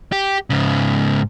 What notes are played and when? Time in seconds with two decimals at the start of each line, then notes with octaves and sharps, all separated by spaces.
0.12 G4
0.50 G#2 C#3